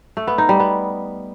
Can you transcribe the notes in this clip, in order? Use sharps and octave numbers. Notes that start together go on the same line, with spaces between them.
A3
B3
D#4
G3
B3